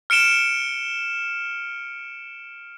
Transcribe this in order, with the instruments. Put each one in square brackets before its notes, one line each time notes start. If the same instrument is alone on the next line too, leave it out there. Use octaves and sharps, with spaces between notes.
[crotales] F6 C#7 D7 E7 G7